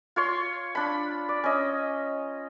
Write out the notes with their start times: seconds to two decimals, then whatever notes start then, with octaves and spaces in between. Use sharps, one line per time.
0.16 F4 C#5 C6
0.75 D4 B5
1.29 D5
1.44 C#4 D#5